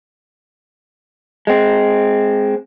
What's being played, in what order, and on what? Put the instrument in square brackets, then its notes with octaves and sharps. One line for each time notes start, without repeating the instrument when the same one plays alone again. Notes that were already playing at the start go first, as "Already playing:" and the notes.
[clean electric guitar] G#3 C4